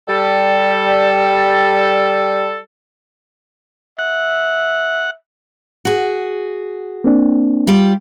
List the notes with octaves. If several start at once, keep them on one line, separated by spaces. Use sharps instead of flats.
G3 A4
E5 F#5
F#4 G#4
A#3 C4 D4
G3 F4 G4